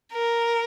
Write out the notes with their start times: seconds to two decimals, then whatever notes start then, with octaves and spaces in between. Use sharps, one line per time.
0.14 A#4